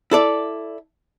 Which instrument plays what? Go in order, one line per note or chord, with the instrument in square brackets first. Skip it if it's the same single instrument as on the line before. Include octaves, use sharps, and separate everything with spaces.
[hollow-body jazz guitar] E4 A4 D5